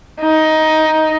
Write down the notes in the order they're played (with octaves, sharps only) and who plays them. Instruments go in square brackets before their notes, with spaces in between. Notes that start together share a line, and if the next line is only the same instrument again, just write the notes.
[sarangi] D#4